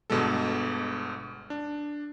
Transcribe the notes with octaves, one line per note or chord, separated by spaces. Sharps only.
G1 B2 D3 G#3 A4
D4